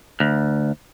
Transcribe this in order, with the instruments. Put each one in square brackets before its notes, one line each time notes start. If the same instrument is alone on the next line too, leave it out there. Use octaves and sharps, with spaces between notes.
[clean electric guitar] D2